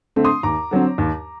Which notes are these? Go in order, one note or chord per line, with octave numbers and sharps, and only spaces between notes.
D3 A3 C4
C6 D#6
D#2 A#5 D6
D3 F#3 C4
D#2